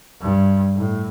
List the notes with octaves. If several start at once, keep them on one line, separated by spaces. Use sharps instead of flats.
G2
A2